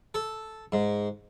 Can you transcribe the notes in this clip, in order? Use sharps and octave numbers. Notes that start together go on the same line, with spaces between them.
A4
G#2